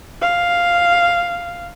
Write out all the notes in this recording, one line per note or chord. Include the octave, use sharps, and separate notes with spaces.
F5